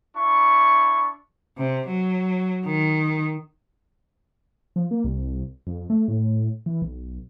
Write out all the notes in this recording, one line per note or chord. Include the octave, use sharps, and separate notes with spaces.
D4 E4 C#6
C3
F#3
D#3
F3
A#3
C2
F2
A3
A2
E3
B1